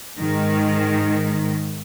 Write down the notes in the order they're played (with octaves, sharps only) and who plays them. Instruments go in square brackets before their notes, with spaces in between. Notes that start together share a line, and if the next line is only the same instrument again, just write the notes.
[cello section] G#2 D#3